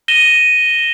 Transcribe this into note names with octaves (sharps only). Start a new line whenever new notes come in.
A#6 D#7 E7 G7